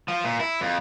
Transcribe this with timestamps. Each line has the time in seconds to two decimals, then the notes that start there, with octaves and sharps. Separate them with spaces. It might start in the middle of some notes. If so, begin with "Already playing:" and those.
0.08 F3
0.24 A#2
0.40 E4
0.61 F2